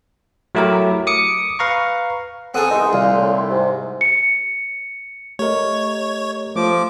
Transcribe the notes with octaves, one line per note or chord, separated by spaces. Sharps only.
F#3 A3 E4 G4 A#4
D6 D#6 C#7
B4 F5 A#5 C#6
B3 C4 G#4 A4 F#5 D#6
C2 D#4 C6
C2 A#2 E4 G#4 F5
A2
D3 D#3 E4
G#2 C3
C#7
A3 G4 A#4 C#5 D#5
F3 A3 D6